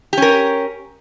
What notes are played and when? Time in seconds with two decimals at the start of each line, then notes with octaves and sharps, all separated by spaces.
0.13 G4
0.18 C#4
0.22 A#4